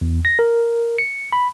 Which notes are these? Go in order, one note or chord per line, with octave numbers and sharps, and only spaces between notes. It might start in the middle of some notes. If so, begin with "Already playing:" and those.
E2
A#6
A#4
C#7
B5